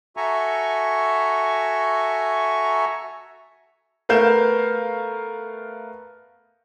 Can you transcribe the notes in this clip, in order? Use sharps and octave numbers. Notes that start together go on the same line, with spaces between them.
F#4 A4 E5 G#5 A#5 C#6
A3 B3 A#4 F5 G6 E7